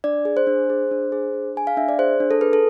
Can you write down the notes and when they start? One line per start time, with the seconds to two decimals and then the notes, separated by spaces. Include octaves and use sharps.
0.04 D4 D5
0.25 G#4
0.37 C5
0.47 D4
0.70 G#4
0.91 D4
1.12 G#4
1.34 D4
1.56 G#4 G#5
1.67 F5
1.77 D4 E5
1.89 D5
1.99 G#4 C5
2.20 D4
2.31 A4
2.41 G#4 B4
2.53 A4